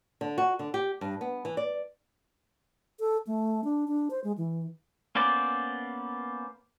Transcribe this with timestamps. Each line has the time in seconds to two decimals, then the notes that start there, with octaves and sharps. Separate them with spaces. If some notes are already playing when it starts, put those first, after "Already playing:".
0.21 D3
0.38 F#4
0.59 D3
0.74 G4
1.01 G2
1.21 B3
1.45 E3
1.57 D5
3.00 A4
3.27 A3
3.64 D4
3.88 D4
4.10 C5
4.24 G#3
4.38 E3
5.15 A#3 B3 C#4 C5 D5